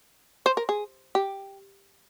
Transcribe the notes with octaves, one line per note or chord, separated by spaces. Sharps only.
C5
A#4
G#4
G4